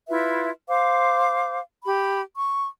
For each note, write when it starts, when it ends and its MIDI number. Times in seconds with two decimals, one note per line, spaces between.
0.09 0.49 64
0.09 0.49 65
0.09 0.49 71
0.09 0.49 76
0.68 1.59 72
0.68 1.59 77
0.68 1.59 86
1.84 2.20 67
1.84 2.20 83
2.36 2.67 85